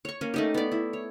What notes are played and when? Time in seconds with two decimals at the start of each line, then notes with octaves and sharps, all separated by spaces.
0.05 C#5 C#6
0.21 A#3 C#4
0.34 A3 D#4 G4
0.54 B3 D5
0.72 E4
0.93 C#5